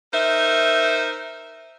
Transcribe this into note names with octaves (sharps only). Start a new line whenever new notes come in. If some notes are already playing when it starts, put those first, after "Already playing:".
D#4 A#4 C5 E5